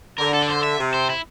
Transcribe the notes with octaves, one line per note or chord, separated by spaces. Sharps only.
D3 A#4
A4
D5
C5
E5
C3
C5
E4